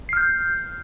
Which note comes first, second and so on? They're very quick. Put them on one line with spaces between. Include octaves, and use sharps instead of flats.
C7 F6 G6